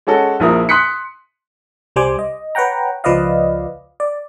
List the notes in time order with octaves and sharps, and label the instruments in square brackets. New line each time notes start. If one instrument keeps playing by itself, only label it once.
[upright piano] G#3 C#4 F#4 A4
A#1 F3 E4 A#4 D#6
C6 D#6 F#6 B6 C#7
[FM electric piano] C2 G3 C5 G#5 D6
D#5
B4 C#5 F#5 G5 A#5
C#2 F3 B4 D5 D#5 F5
D5